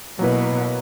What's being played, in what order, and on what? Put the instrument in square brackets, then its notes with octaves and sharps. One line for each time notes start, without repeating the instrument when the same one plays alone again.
[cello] B2 [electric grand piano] F#3 A#3 E4 B4